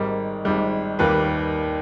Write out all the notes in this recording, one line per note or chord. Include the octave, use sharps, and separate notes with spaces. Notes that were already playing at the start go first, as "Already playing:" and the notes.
Already playing: G#1 G#2 G3 A#4
G#1 G#2 G3
D#2 D#3 G3 A#3 B4